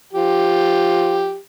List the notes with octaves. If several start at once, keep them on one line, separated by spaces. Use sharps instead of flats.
F3 G4